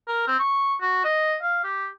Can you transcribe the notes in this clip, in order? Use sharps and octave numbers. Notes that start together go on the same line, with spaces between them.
A#4
C4
C#6
F#4
D#5
F5
G4